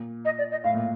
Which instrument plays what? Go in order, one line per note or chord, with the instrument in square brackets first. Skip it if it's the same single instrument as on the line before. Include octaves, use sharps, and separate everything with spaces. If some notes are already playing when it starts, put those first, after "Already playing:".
Already playing: [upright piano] A#2
[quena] D#5
D5
D#5
[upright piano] A2 [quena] F5
[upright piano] A#2